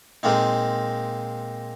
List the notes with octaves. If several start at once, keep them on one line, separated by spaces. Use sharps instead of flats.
A#2 G#3 A#3 C4 D#4